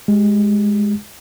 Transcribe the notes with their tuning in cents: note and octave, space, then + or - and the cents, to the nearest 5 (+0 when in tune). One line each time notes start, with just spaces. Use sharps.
G#3 +0 G4 -10